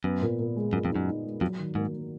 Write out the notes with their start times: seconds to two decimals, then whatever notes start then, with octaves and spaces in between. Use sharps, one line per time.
0.04 F#2 B3
0.22 A#2
0.39 A#2
0.56 G#3
0.73 F#2 A#2
0.85 F2
0.90 D#4
0.96 F#2
1.08 D#4
1.25 G#3
1.41 F2 F#3
1.59 D#3
1.75 G#2 A#3
1.93 A#3